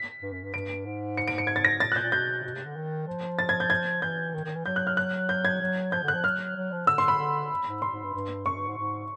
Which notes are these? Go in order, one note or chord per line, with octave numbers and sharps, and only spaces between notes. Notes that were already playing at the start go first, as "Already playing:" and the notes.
Already playing: B6
G2
F#2
G2
G2 D7
G#2
C#7
D7
C#7
G#6
A6
A#6
A2 A6
A#2 F#6
G6
A#2
B2 G6
B2
C3
D3
D#3
F3
A6
G#6
G6
G#6
E3 G6
D#3
D#3
E3
F#3 G6
F#6
F6
F#6
G6
G#6
F#3
F3 G6
D3
F#6
F3
F#3 F6
F#3
F3
D3 E6
C6
B5
D3
G#2
C6
G#2
G2
G2
F#2 C#6
G2
G#2
G#2